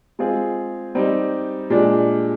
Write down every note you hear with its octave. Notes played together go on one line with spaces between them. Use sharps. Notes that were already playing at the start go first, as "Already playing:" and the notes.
G#3 C4 F4 G#4
G3 C4 D#4 G4
A#2 G#3 D4 G4